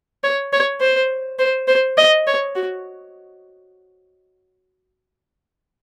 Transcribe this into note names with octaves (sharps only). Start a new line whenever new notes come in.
C#5
C#5
C5
C5
C5
D#5
C#5
F#4